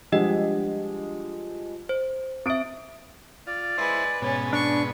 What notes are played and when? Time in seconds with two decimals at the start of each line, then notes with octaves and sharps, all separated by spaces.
0.12 F3 G3 G#3 D4 D#5 F#5
1.89 C5
2.46 C4 E5 D#6 D7
3.47 F4 D5
3.78 G#3 E4 B4 C5
4.22 G#2 B2 B3 C#4
4.53 D4 C#6